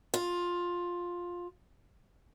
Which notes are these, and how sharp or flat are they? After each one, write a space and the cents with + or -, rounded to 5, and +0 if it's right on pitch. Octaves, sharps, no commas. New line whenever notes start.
F4 +10